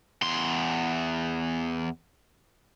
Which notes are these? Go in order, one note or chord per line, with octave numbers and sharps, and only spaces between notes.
E2 C6